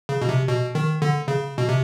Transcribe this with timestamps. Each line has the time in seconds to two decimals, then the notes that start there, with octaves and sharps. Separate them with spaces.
0.09 C#3
0.21 B2
0.29 C3
0.49 B2
0.75 D#3
1.02 D3
1.28 C#3
1.58 B2
1.69 C3